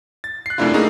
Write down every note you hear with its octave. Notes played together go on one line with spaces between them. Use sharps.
A6
F#6 C7
F#2 C3 A3 D4 E4 F4
A3 A#3 D#4 G#4